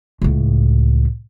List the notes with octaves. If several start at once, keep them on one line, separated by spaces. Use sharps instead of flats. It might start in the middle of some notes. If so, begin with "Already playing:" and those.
C#2 A2